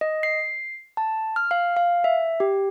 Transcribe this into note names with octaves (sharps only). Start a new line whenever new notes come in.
D#5
C7
A5
F6
F5
F5
E5
G4